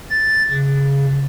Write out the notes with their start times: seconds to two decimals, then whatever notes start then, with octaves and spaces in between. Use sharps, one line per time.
0.11 A6
0.51 C#3